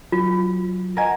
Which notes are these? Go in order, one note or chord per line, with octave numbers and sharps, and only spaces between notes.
F#3 F4
A#4 D#5 F#5 G#5 A#5